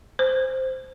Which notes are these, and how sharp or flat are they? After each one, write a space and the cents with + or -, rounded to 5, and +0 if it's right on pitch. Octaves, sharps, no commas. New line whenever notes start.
C5 -5